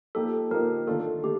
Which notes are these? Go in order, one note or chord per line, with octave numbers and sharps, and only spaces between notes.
F3 A#3 D#4 G4 A4
F3 A#3 D#4 G4 A#4
D#3 A3 D4 F4 A4
D#3 A3 G4